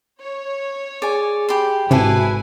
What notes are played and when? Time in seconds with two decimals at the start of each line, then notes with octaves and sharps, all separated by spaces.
0.19 C#5
1.02 G#4 D5 G#5
1.48 G4 B5 C6
1.91 G#1 C3 E4 F#4 G#4 A4 B4 G#5